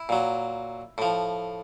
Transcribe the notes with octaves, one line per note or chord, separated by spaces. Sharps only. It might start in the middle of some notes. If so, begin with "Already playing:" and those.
Already playing: E4
A#2 F#3
A2 F3